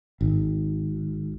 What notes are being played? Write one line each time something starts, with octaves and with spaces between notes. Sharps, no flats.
G#1